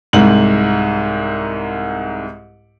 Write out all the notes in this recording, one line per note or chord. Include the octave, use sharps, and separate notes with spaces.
C2 G#2 F#7